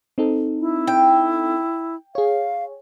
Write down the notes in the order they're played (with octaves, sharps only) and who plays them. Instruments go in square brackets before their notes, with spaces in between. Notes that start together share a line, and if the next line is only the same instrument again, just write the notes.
[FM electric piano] C4 D#4 A4
[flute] E4
[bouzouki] G5
[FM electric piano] G#4 C#5 [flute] F5